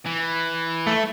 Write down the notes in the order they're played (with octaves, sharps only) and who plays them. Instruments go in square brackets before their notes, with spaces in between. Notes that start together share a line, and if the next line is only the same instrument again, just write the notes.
[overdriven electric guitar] E3
[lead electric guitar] A3